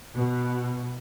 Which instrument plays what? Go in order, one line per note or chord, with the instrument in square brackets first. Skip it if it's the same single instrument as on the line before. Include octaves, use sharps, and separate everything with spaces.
[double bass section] B2